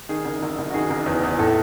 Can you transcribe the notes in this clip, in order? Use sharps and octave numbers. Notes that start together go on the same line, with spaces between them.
D#3 G#4
F#1
F#1
F#1
F#4
D#3 G#4
F#1
E2
E2
A2 A4